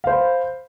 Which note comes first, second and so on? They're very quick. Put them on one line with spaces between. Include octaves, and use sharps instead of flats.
F5 C5 B5